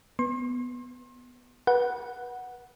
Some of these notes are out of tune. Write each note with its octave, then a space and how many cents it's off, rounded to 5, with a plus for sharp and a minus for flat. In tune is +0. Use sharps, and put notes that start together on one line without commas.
B3 +0 C6 +35
B4 -30 F#5 +0